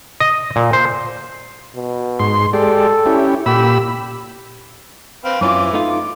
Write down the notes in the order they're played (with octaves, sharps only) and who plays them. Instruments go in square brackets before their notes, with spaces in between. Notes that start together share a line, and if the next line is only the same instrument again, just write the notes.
[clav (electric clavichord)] D#5
A#2
C5
[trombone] B2
[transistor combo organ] G#2 C6
[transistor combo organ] G#3 G4 D5 [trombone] A4
[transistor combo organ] C#4 E4 G4
[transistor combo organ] A#2 B5 E6 [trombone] G4
[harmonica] C4 B4 F5
[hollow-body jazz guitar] F#2 C#4 F4 [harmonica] E3 D6
[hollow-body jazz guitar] A3 D#4 F4
[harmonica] D6